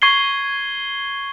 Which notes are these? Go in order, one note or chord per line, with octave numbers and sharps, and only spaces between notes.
C#6 G#6 C7 G7